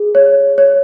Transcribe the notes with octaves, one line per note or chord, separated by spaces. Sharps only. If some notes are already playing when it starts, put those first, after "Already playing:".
Already playing: G#4
C#5
C#5